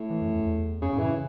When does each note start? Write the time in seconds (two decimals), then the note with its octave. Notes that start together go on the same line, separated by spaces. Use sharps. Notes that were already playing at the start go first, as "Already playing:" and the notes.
Already playing: A2
0.10 E3
0.22 F#2
0.34 E2
0.45 E2
0.82 F#2 C#3
0.93 A2
0.99 E3
1.05 C#3